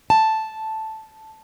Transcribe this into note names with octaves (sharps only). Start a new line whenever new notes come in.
A5